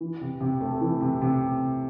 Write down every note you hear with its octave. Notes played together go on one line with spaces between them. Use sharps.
E3
C3
C3
A3
E3
C3
C3